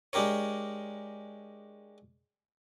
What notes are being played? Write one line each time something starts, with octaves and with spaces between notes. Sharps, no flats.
G#3 D4 G4 A#4 C#5